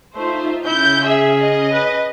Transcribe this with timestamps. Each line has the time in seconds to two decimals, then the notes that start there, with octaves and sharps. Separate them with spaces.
0.15 A3 D#4 F4 C5 E5
0.65 C#3 C#4 E4 G6
1.06 G#4 E5
1.43 D#5
1.73 B4